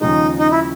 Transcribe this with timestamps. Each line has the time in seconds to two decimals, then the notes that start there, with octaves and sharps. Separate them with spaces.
0.01 D#2 C#3 F3 G#3 D#4
0.39 D#4
0.51 E4